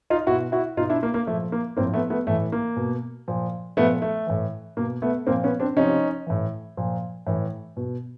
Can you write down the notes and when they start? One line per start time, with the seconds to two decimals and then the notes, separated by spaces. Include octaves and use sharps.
0.10 D#4 F4
0.27 B2 E4 F#4
0.52 E4 F#4
0.77 B2 D#4 F4
0.89 D4 E4
1.03 A#3
1.14 A#3
1.27 A#2 F3 A3
1.52 A#3
1.77 A2 F3 A#3 C4
1.93 A3 B3
2.10 A3 B3
2.27 A2 E3 A3
2.52 A#3
2.76 B2
3.28 A#2 F3
3.77 A#2 F3 A3 B3
4.02 A3
4.27 A2 E3
4.77 B2 A#3
5.02 A3 B3
5.27 A#2 F3 A#3 C4
5.44 B3 C#4
5.60 C4 D4
5.76 C3 F3 C#4 D#4
6.27 A2 E3
6.77 A#2 F3
7.27 A2 E3
7.77 B2